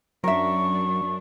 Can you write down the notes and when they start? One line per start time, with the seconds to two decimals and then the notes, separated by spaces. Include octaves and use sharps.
0.24 F#2 F#3 D4 A#4 E5 C#6